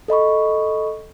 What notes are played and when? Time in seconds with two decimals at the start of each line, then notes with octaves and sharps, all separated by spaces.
0.08 A4 D#5 B5 C#6